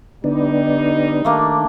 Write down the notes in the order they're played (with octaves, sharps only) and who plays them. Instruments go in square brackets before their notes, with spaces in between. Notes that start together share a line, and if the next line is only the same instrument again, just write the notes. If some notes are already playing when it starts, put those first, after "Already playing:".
[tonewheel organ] D3 B3 D4 [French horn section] G3 D#4
[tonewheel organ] D#3 [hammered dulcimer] A3 A#3 D4